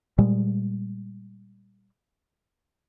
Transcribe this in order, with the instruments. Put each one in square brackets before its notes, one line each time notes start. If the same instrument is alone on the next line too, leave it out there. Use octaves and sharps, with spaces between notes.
[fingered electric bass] A#2 G3 G#3